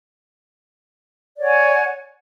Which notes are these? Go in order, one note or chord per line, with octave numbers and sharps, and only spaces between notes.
C#5 D5 F#5 G#5